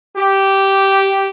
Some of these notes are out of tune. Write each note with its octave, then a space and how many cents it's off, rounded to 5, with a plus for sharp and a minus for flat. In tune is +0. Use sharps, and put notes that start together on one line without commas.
G4 -10